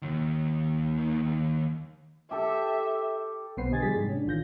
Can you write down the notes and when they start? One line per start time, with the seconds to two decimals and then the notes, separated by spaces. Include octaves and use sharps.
0.02 D#2 D#3
2.31 G4 A4 E5
3.57 B1 B3 B4 C5 C7
3.71 D3 G4 D#5 G#5 G#6 A6
3.82 F3 G3 G4 G#4 A6 B6
3.96 G#2 C3
4.09 C#4 D4
4.26 A1 D#3 F4 G6 A#6